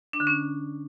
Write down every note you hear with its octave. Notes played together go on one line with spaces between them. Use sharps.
D4
D3
C#4